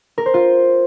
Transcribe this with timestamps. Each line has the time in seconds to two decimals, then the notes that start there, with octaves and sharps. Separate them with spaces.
0.18 A#4
0.26 C5
0.34 F4